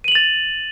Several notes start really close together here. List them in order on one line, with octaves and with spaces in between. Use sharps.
D#7 F#7 F7 A6